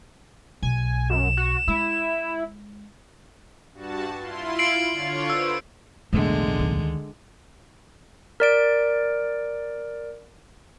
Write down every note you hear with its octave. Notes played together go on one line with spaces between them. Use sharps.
B1 G#5
F#2 E7
F#4
G#3 E4
G2 F#4 A5
E4 F4 C6
C7 D7 F#7
D3 F4 C#5
B4 C5 E6
B1 E2 A2 D3 G#3 A3
D2 D#3
A#4 D5 D7